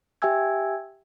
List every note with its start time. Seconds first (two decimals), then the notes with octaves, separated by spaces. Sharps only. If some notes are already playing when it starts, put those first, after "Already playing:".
0.22 G4 E5 G5 G#5 E6 G#6